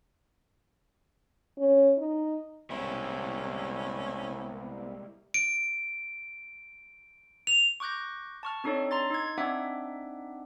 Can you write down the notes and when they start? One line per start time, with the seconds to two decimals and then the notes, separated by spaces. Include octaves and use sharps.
1.58 C#4
1.98 D#4
2.70 C2 G3 G#3 A#3 B3 C#4 E4
5.34 D7
7.47 F7
7.80 C#6 D6 F#6 G6 A#6
8.43 A5 C#6 F6
8.64 C4 D4 D#4 A4 C#5
8.91 A#5 C6 A6
9.10 D#4 G#6
9.38 C4 D4 D#4 E5 F#5 D6